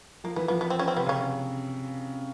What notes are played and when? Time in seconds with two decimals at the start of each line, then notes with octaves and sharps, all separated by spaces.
0.24 F3 A#3
0.36 E3 B3
0.48 F3 B3
0.61 B3
0.70 C4
0.79 C#4
0.88 C4
0.97 C3 B3
1.06 C#3
1.09 C#4